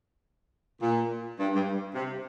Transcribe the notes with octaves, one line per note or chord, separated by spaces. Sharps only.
A#2
G2
G2
C3